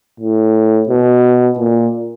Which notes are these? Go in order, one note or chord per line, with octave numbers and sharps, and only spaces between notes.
A2
B2
A#2